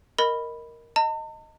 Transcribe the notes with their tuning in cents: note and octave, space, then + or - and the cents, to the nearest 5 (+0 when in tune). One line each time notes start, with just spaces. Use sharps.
A#4 +0 D#5 +0 B5 +0
D#5 +0 A5 +45